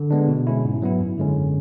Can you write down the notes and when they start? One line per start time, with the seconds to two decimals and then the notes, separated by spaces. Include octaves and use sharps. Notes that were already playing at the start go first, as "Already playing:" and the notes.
Already playing: D3
0.11 G#3 B3 D4
0.28 B2
0.47 G#3 C#4 E4
0.65 G#2
0.82 F#3 B3 E4
1.00 F#2
1.18 D3 G#3 C#4